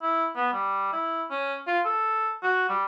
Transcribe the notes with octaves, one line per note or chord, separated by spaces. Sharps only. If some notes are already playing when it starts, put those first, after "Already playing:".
E4
B3
G3
E4
C#4
F4
A4
F#4
G3